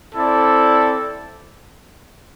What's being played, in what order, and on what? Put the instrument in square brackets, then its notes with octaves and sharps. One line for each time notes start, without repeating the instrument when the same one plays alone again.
[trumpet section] C4 E4 A4 D5